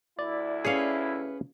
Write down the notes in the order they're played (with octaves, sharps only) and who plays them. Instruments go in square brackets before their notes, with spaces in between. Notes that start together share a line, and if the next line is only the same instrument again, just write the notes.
[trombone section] D2 E4 [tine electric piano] D5
[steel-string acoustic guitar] C#4 B4 [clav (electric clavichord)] G#4 C#5 F5